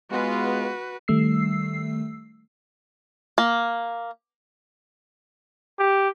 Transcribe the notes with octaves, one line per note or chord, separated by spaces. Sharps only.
G#3 B3 F4 F#4 B4
D#3 G3 A3 E6 C7
A#3
G4